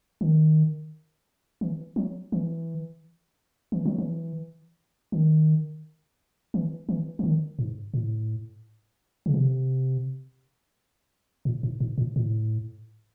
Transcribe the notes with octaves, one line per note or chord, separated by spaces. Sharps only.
D#3
E3
F#3
E3
E3
F#3
E3
D#3
E3
E3
E3
D#3
G#2
A2
C#3
C3
A2
G#2
G#2
A2
A2